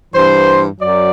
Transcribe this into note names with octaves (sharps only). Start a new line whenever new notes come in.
G2 E3 C5
F#2 F#3 D5